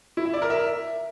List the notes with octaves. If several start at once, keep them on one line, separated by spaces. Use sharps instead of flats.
E4
E5
D5
A#4
E5